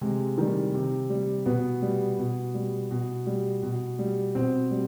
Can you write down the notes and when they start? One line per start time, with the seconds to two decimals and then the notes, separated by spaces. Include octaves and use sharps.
0.01 C3 G#3
0.38 D#3 G3
0.74 C3
1.10 G3
1.46 B2 B3
1.82 G3
2.19 B2
2.54 G3
2.91 B2
3.27 G3
3.63 B2
3.99 G3
4.35 B2 C4
4.71 G3